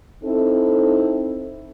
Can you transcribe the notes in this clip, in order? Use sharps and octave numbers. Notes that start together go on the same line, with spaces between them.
C4 D#4 E4 A4